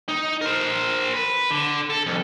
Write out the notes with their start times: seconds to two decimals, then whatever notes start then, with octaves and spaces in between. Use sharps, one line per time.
0.09 D#4
0.41 A#4 C5
1.14 B4
1.51 D3
1.90 A4
2.06 C2 F2